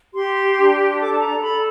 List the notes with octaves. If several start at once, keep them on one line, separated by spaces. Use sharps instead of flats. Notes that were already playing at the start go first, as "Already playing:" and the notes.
G4 C6
D4
A4 D6
A5
A#5
A4 B5